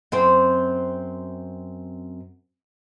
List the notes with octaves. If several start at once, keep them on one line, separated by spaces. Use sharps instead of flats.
F#2 C4 C5